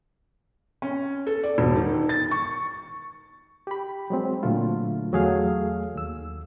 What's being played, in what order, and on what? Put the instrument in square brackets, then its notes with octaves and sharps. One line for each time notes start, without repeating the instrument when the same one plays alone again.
[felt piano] C#4
A4
D5
E1
D#3
A6
C#6
[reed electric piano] G4 B5
F#3 G#3 C4
A#2 D3 F#3 A3 F4
E2 F#3 A3 G#4 A4 F5
D#2 E6